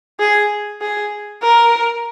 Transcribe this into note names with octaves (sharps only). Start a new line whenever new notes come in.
G#4
G#4
A#4